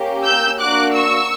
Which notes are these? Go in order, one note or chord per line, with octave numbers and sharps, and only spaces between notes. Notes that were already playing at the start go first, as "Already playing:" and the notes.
Already playing: A#3 C#4 G4
E6 G6
A#3 D4 F#4 D6 F#6
C#6 E6